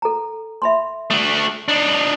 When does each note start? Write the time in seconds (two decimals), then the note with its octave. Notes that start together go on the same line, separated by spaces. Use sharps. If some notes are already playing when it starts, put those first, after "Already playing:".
0.02 A4 A#5
0.62 E5 B5 C6
1.10 A3 F#4 D#6
1.68 D4 D#4